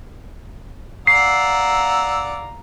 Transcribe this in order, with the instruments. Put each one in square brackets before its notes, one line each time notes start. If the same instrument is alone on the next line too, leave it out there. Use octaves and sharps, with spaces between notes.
[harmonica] D5 F#5 E6 [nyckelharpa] F5 A#5 [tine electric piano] C7